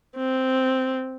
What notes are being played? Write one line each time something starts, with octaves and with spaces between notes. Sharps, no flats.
C4